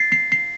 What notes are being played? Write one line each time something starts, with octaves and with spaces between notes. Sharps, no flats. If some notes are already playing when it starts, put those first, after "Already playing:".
Already playing: A6 C7
C7
C7